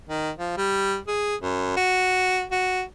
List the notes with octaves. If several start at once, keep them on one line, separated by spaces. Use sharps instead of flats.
D#3
F3
G3
G#4
F#2
F#4
F#4